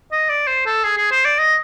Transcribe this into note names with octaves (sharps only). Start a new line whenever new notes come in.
D#5
D5
C5
A4
G#4
G#4
C5
D5
D#5